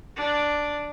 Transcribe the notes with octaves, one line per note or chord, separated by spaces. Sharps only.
D4